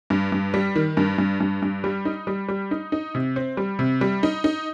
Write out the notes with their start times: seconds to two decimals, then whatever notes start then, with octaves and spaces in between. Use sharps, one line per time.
0.10 G2
0.32 G2
0.54 G3
0.76 D#3
0.97 G2
1.18 G2
1.40 G2
1.62 G2
1.84 G3
2.05 D#4
2.27 G3
2.48 G3
2.71 D#4
2.92 D#4
3.15 C3
3.36 C4
3.57 G3
3.79 C3
4.01 G3
4.23 D#4
4.44 D#4